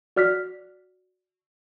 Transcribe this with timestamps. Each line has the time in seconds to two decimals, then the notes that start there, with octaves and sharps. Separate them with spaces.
0.16 F#4 D5 F6 F#6 B6